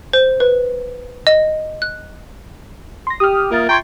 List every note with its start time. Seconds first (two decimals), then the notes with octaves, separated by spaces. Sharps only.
0.13 C5
0.40 B4
1.27 D#5
1.82 F#6
3.07 C6 A#6
3.20 G4 D#6 F6
3.51 A#3 F4 E5 A6
3.69 G5 A#5 C6 C#6 G#6